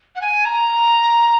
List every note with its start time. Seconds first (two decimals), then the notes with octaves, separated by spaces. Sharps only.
0.15 F#5
0.21 G#5
0.45 A#5